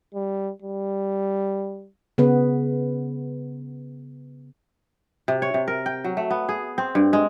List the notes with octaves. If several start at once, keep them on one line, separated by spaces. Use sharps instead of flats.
G3
G3
C#3 B3 B4
C3
C#5
C3
A#4
G5
F#3
A3
B3
G#4
C4
G2
G#3